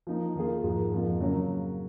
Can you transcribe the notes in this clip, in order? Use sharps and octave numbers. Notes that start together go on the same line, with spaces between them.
F3 A#3 D#4 A#4
D#3 A#3 F4 G#4
G#2 F3 G#3
F2 F3 A#3
C#3 F#3 A#3 C#4